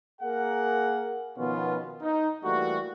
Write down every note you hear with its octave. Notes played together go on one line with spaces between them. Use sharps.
A#3 G#4 A#4 F#5
B2 D#3 F3 B3 C#4 F4
D#4
E3 G3 A3 A#3 F#4